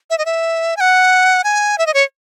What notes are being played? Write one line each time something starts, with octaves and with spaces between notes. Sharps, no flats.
E5
D#5
E5
G#5
F#5
G#5
E5
D#5
C#5